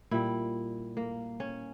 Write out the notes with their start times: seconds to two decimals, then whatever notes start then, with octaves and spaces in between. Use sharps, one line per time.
0.11 A#2 G3 E4
0.97 A#3
1.40 C#4